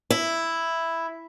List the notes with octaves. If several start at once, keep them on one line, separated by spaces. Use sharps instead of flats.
E4